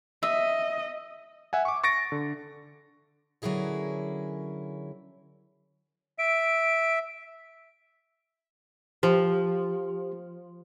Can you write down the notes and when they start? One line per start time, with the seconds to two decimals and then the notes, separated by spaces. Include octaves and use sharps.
0.23 D#5 E5
1.53 E5 F#5 G#5
1.65 C#6 D6
1.84 C#6 A6 A#6 D7
2.12 D3
3.42 D3 F#3 C#4 E4 G#4 A#4
6.19 E5 D7
9.03 F3 G4